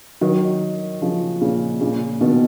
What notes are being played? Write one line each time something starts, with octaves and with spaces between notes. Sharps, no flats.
D#3 F#3
C#3 F3
A#2 C#3
A#2 C#3
B2 D#3